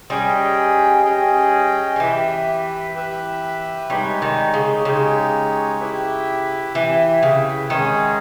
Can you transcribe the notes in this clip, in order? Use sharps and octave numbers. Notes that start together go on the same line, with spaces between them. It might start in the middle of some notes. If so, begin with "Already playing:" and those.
G3 C#4 G#4 D#5 G5
C#4 G#4 D#5 G5
G3
E3 G4 B4 E5
G4 B4 E5
G3 G#3 D#4 G4 C#5
D#3
C#3
C#3 G#3 D#4 G4 C#5
E4 G4 B4 E5
E3 E4 G4 B4 E5
C#3
D#3 G#3 C#4 G#4 C#5